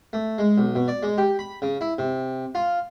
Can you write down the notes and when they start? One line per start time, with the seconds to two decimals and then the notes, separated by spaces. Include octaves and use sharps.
0.13 A3
0.38 G#3
0.58 B1
0.75 B2
0.88 D5
1.03 G#3
1.18 G4
1.39 B5
1.62 C#3
1.81 E4
1.98 C3
2.55 F4